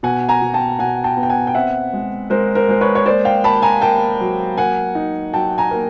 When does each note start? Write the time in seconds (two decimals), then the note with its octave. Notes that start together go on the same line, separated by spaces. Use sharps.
0.03 B2 F#5 G#5
0.29 G#5 A#5
0.42 B2
0.54 G5 A5
0.79 B2 F#5 G#5
1.04 G5 A5
1.17 B3
1.23 G5
1.29 F#5 G#5
1.47 G5
1.54 C4 E5 F#5
1.93 G#3
2.30 G#3 A#4 C5
2.55 A#4 C5
2.69 G#3 C5
2.81 B4 C#5
2.95 C#5
3.06 A#3 C5 D5
3.25 F5 G5
3.44 A#3 A5 B5
3.62 G#5 A#5
3.82 A#3 G5 A5
4.20 F#3
4.57 A#3 F#5 G#5
4.95 D#4
5.33 F#3 G5 A5
5.58 G#5 A#5
5.71 A#3